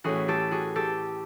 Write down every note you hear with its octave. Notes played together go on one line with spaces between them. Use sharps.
A2 E3 A3 C#4 F#4 G#4
G4 A4
F#4 G#4
G4 A4